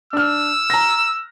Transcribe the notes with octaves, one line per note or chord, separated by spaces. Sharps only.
D4 E6 F6
A#5 A#6